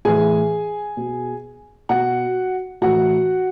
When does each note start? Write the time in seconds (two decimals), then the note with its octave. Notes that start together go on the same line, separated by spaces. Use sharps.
0.05 A2 E3 G#4 G#5
0.97 B2
1.89 B2 F#4 F#5
2.81 A2 E3 F#4 F#5